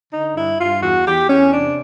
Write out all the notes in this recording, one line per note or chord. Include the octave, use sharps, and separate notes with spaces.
D3 D#4
G2 E4
G2 F4
E2 F#4
E2 G4
E2 C#4
C3 D4